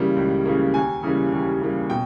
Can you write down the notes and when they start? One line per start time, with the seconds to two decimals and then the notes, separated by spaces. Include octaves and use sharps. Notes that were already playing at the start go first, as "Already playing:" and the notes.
Already playing: C#3 E3 G3 A#3
0.16 C#2
0.45 C#3 E3 G3 A#3
0.74 D#2 G#5
1.03 C#3 E3 G3 A#3
1.32 D#2
1.61 C#3 E3 G3 A#3
1.90 B2 G5